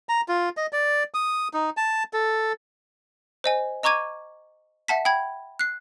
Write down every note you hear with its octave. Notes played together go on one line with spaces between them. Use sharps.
A#5
F4
D#5
D5
D#6
D#4
A5
A4
C5 D#5 G#5
D#5 A#5 C#6 D6 G#6 D#7
E5 F#5 A5 B6
G5 B5 G#6
F#6 C7